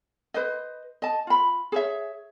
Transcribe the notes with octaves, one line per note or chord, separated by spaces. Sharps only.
B4 C5 D#5
D#5 A5
F4 B5
G#4 C#5 E5